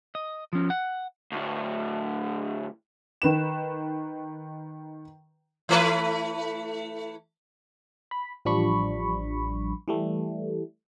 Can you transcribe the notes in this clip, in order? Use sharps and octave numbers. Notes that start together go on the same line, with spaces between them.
D#5
F3 C#4
F#5
D2 A2
D#3 B4 E7
E3 A3 B4
B5
A1 F3 G3 D4 B5 C#6
E3 G3 A3